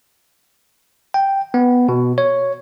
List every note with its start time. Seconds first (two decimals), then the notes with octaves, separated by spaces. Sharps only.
1.14 G5
1.54 B3
1.89 B2
2.18 C#5